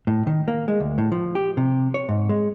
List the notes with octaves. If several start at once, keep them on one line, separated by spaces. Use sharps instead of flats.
A2
D#3
A#3
G#3
D2
A2
F3
G4
C3
C#5
G#2
G#3